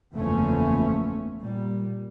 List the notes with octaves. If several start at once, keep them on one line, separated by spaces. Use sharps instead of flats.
F#1 E2 F3 A3 B3 C#4
A#2 G3